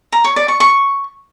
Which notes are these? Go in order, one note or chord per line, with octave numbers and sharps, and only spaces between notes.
A#5
C#5
D5
C#6
C#6